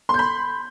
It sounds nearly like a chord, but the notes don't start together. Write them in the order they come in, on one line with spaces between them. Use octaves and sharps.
C6 G6 B5